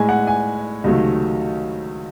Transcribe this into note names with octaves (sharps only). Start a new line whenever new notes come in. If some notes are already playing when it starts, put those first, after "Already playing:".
Already playing: A2 G#3 G#5
F#5
G#5
C#2 C3 D#3 F#3 A3